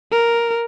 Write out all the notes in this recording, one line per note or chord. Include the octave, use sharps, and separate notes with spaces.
A#4